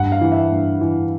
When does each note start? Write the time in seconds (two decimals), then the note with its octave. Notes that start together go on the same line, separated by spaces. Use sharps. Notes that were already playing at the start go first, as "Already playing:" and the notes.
Already playing: G2 F#5
0.12 F5
0.21 E3
0.32 E5
0.52 G2
0.81 E3